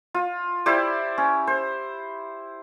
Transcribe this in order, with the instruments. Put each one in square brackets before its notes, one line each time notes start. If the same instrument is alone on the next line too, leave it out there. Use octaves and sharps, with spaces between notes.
[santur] F4
E4 G4 C5 D5
C#4
C5